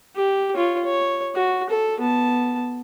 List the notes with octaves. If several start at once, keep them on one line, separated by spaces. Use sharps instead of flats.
G4
F4 C#5
C#5
F#4
A4
B3 A5